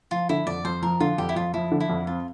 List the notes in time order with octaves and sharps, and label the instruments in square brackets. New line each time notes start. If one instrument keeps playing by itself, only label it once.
[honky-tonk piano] F3 [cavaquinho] F4
[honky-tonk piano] D3 [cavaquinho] E4
[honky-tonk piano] F2 [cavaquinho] D5
[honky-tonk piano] F2 [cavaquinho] C5
[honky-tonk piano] F3 [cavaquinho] A#4
[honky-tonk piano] D3 [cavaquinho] F4
[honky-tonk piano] F2 [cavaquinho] G4
[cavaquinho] E4
[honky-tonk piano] F2 [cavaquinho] F4
[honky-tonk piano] F3 [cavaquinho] E4
[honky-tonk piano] D3
[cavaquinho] E4
[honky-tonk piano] F2
[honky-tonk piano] C4 [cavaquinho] F4